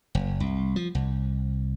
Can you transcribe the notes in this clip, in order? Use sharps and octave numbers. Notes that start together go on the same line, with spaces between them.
F#1
C2
F3
C2